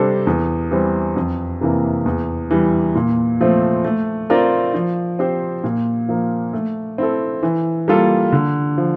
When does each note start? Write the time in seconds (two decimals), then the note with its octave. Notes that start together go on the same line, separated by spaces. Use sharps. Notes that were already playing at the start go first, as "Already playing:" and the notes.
Already playing: C3 G3 D4 A4 C5
0.27 E2
0.71 E3 G3 C4
1.16 F2
1.61 C3 E3 A#3
2.06 E2
2.51 E3 G3
2.95 A#2
3.41 F3 A3 C4
3.85 A3
4.30 C4 F4 A#4 D5
4.74 F3
5.19 C4 G4 C5
5.64 A#2
6.09 F3 A#3
6.53 A3
6.98 C4 E4 A4
7.43 E3
7.88 G3 A#3 F4 A4
8.32 D3
8.78 F3